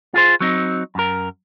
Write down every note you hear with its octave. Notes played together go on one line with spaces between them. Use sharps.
F4 G#4 C5
F#3 C4 D#4
F#2 A#4